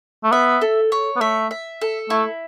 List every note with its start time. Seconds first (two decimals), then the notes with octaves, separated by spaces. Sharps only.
0.24 A3
0.32 B3 E5
0.61 A4
0.92 C#5
1.16 B3
1.21 A3 E5
1.51 E5
1.81 A4
2.10 A3 E4